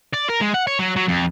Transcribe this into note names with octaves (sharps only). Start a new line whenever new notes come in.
D5
A#4
G#3
F#5
C#5
F#3
F#3
F2